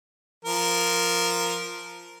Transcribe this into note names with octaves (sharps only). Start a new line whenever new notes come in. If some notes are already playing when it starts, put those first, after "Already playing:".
F3 A#4